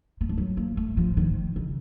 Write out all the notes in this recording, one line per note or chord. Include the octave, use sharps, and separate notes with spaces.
A#3
A3
F#3
A#3
A3
F3
D#3
C#3